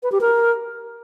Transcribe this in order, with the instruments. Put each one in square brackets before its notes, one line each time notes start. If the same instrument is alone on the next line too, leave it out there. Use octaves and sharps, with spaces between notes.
[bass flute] B4
G4
A#4